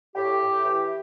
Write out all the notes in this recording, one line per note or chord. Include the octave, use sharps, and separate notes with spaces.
A2 G4
A2
E3